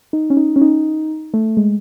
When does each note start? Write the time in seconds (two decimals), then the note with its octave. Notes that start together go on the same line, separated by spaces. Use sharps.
0.13 D#4
0.30 C#4
0.37 D#4
0.56 C#4
0.61 D#4
1.34 A3
1.57 G#3